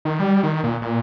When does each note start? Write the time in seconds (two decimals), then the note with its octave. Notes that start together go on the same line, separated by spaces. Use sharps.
0.05 D#3
0.20 G3
0.43 D#3
0.64 A#2
0.82 A#2